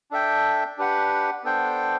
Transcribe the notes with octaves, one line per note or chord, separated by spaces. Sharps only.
D4 A4 E5 G5
D4 G4 B4 F#5
B3 D4 A4 C5 G5